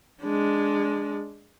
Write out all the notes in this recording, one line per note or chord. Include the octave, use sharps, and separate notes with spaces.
G#3 D4